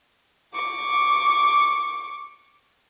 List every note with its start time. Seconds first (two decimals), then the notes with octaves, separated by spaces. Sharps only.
0.54 C#6 D6